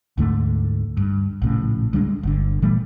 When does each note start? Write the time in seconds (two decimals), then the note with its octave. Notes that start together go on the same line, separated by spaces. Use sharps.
0.18 D2 G#2 D3 A3
0.97 G2
1.42 A#1 A2 C#3
1.93 D2 G3 G#3 D4
2.23 G1 D3
2.62 A#2 E3 G3 A3